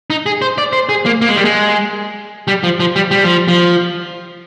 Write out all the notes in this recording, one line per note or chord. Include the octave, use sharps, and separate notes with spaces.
D#4
G#4
C5
D5
C5
G#4
A#3
A#3
G#3
G3
G#3
G3
F3
F3
G3
G3
F3
F3